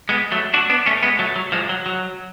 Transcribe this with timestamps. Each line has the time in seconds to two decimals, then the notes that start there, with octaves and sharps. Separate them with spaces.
0.09 G#3 B3
0.32 F#3 A3
0.54 D4 F#4
0.70 B3 D4
0.86 A3 C#4
1.03 G#3 B3
1.19 F#3 A3
1.36 F#3
1.52 F3 G#3
1.69 F#3
1.86 F#3